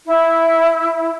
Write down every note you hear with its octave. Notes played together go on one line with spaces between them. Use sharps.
E4